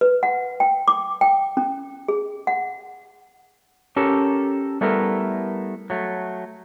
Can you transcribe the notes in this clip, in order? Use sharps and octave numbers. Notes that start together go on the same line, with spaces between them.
B4
F#5
G5
D6
G5
C#4
G#4
F#5
C#4 G4 A4 A#4
G3 A3 B3 E4 A4 A#4
F#3 A3